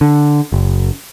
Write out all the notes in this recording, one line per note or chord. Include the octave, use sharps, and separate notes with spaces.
D3
F#1